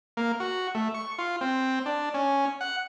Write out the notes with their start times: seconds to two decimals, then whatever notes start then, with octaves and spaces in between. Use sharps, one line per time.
0.17 A#3
0.40 F#4
0.75 A3
0.94 C#6
1.19 F4
1.41 C4
1.86 D4
2.14 C#4
2.61 F#5